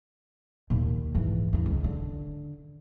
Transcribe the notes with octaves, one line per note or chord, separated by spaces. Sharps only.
D#2 A#2
G#2 E3
E2 G2
C#2
D3